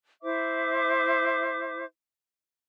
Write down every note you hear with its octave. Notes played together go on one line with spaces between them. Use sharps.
E4 C5 E5 D6